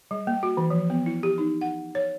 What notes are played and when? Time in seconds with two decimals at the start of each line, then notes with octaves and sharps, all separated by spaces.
0.11 G3
0.27 A#3
0.43 F#4
0.57 E3
0.70 F3
0.90 B3
1.06 E4
1.23 G4
1.38 D#4
1.61 F#5
1.95 C#5